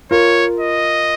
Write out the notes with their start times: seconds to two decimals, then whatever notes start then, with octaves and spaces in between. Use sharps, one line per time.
0.11 F4 A#4 C#5
0.60 D#5